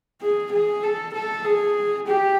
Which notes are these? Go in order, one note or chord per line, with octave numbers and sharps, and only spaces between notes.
G#4
G#4
A4
A4
G#4
G4